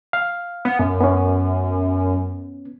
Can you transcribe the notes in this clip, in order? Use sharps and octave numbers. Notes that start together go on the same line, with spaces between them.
F5
B3
F#2
B3 C#4